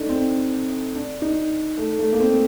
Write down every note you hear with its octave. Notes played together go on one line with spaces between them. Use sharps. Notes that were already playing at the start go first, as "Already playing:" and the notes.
Already playing: A3 D4 D#4
C4
D4
D#4
A3
A3
A#3
C4